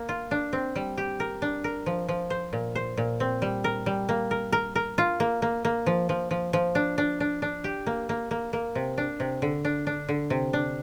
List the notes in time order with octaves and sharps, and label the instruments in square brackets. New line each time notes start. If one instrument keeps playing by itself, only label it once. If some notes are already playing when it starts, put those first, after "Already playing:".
Already playing: [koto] A#3
F4
D4
C4
G3
G4
A#4
D4
A#4
F3
F3
C5
A#2
C5
A#2
C4
G3
A#4
G3
A#3
A#4
A#4
A#4
F4
A#3
A#3
A#3
F3
F3
F3
F3
D4
D4
D4
D4
G4
A#3
A#3
A#3
A#3
C3
D4
C3
D3
D4
D4
D3
C3
D4